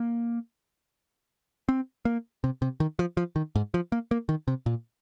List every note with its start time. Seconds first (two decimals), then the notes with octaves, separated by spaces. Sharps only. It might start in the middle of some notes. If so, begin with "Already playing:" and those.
Already playing: A#3
1.69 C4
2.05 A#3
2.44 C3
2.62 C3
2.80 D#3
2.99 F3
3.17 F3
3.36 D#3
3.55 G#2
3.74 F3
3.92 A#3
4.11 A#3
4.29 D#3
4.48 C3
4.66 A#2